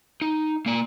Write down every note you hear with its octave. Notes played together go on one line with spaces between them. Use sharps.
D#4
A#3 D5